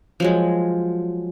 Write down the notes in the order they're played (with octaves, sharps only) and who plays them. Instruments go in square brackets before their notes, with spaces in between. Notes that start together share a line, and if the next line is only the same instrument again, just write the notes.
[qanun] F3 F#3 G#3